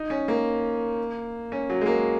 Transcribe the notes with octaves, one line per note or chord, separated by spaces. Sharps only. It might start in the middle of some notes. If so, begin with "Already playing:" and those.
Already playing: D#4
C#4
A#3
C#4
F#3
G#3
A#3